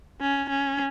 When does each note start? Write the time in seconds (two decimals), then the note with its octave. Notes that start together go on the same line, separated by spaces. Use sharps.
0.21 C#4
0.50 C#4